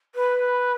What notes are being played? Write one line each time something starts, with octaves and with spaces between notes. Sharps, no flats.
B4